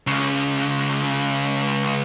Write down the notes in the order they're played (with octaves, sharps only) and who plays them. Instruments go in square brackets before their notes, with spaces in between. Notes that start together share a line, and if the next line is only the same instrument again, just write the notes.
[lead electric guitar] C#2 C#3